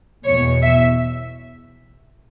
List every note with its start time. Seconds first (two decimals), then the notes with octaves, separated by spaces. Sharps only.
0.24 E2 B2 C#5
0.62 E5